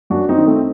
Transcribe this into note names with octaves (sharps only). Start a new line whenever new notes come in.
F#2 D4 F#4
C4 D#4
D#3
A3 C4